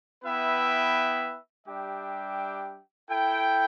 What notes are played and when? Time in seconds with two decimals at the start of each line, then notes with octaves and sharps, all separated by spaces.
0.24 B3 E4 B4 E5 G5
1.66 G3 D4 G4 E5 G5
3.09 E4 A4 G5